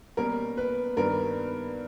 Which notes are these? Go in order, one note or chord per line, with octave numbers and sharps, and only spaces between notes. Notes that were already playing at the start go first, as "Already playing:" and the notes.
B2 G3 A#3 C#4 A#4
B4
G2 D#3 G3 B3 A#4